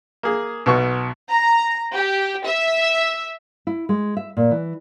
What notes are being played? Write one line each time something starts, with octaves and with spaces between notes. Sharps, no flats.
A#3 G#4
B1 B2 C#6
A#5
G4
E5
E4
G#3
E5
A#2
E3